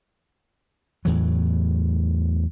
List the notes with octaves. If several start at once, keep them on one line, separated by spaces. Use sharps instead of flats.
E2 A2 E3 F#3